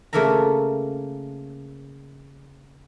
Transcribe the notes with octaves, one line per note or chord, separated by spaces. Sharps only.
C#3 A3 A#3 A#4 E5 A#5